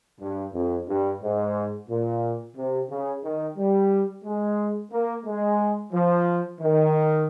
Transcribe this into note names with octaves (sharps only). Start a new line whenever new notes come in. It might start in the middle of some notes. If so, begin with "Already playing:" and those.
G2
F2
G2
G#2
A#2
C3
C#3
D#3
G3
G#3
A#3
G#3
F3
D#3